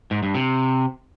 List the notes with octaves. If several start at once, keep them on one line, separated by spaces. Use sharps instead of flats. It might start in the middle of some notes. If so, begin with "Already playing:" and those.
G#2
G2
C3